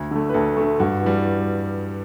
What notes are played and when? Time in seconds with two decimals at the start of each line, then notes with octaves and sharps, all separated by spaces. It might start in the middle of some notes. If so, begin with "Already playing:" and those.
Already playing: D2
0.11 D3 A3
0.29 B4
0.34 D2 A4
0.57 D3 A3
0.80 G2 F#4
1.02 E3 G3